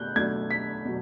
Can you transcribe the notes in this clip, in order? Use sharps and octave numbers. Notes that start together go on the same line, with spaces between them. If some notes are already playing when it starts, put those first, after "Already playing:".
Already playing: B2 A3 F#6 G6
B2 F#3 A3 D4 G#6
B6
B2 F#3